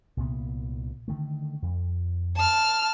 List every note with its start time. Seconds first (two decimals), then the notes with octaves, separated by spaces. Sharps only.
0.17 C2 A#2 B3
1.08 D3 D#3 A3
1.62 F2
2.36 A5 F6